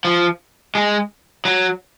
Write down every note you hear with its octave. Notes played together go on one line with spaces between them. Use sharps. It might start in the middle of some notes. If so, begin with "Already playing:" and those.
F3
G#3
F#3